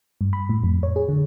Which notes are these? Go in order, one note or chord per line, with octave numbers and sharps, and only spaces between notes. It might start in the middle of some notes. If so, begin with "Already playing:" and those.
G2
B5
A2
F2
C#5
G#4
D3